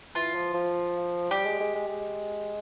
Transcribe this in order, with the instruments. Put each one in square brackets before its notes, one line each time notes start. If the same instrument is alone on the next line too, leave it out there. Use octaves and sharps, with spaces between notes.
[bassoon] E3 [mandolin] F4
[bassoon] F3
F3
[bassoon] G3 [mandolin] G4
[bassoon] G#3
G#3
G#3
G#3